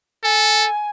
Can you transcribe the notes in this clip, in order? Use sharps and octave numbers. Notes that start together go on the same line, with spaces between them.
A4 G#5